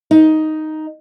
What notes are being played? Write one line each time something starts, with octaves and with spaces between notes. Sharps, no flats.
D#4